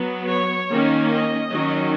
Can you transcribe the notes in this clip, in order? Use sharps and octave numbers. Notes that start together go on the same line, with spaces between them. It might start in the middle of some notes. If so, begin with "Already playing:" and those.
Already playing: F#3 B3
C#5
D#3 A#3 C#4
D#5
D#3 F#3 C#4